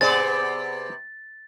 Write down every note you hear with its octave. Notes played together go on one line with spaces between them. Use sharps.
C3 B3 G#4 C5 D5 A6